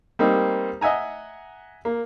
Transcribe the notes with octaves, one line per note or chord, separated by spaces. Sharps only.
G3 A#3 C4 D#4
D#5 E5 F#5 G#5 A#5
A#3